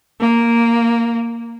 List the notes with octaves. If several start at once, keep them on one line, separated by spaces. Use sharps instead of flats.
A#3